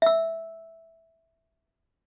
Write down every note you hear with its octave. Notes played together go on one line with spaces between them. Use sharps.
E5 E6